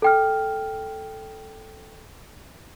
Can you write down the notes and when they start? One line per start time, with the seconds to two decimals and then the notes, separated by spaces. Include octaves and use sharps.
0.02 A4 G5 F6